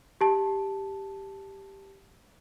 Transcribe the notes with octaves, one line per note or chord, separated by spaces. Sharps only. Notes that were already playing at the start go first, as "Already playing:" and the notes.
G4 A5